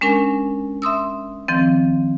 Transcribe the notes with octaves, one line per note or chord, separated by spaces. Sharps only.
G#3 C#4 D4 A#4 G#5
E5 C6 D#6 E6
D#3 F3 C4